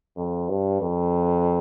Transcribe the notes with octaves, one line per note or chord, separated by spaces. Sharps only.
F2
G2
F2